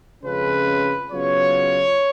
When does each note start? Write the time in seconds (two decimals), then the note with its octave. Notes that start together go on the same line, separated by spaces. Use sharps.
0.23 F2 C#3 G#3 C#4 F4 B4
1.11 C#3 F#3 B3 F4 C#5